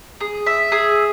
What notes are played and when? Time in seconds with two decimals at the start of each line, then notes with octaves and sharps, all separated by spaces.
0.21 G#4
0.46 E5
0.72 G#4